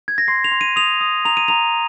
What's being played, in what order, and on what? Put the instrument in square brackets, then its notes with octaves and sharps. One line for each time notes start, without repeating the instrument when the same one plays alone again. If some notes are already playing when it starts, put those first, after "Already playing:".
[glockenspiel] G#6
A#6
C6 C7
F7
C6
D#7
D#6 F7
D#6
A#5 F7
D#7
A#5 F7